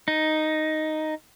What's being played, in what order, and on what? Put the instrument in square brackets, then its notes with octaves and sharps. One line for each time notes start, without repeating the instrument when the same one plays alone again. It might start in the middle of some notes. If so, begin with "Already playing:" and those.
[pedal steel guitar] D#4